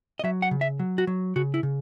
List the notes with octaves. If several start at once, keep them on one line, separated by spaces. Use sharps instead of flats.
D#5
F#3 E5
F#5
C#3
E5
F#3
F#4
F#3
C#3 F#4
E4
C#3